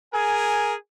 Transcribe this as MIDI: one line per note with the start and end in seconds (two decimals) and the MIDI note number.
0.14 0.76 68
0.14 0.76 70
0.14 0.74 80